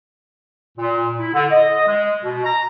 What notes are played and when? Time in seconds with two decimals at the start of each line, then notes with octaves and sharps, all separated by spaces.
0.78 A#2
1.19 E4
1.34 D3
1.51 D#5
1.87 G#3
2.23 B2
2.45 A#5